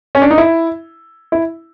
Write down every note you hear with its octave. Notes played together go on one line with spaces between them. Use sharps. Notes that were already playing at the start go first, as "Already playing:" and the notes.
C#4
D4
D#4
E4
E4